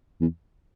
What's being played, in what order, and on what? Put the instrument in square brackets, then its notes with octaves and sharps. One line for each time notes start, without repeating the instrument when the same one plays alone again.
[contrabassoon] E2